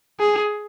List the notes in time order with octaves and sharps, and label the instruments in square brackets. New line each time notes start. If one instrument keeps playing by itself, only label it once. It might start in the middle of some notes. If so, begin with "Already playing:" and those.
[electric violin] G#4